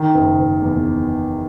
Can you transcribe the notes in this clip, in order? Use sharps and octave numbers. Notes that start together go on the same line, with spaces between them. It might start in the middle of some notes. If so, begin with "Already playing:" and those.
Already playing: D#3
F#1
F#1
E2